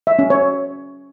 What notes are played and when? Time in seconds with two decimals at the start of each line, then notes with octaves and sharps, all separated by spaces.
0.07 E5
0.19 C#4
0.30 C#5